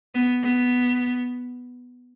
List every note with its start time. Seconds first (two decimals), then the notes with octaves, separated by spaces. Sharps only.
0.15 B3
0.43 B3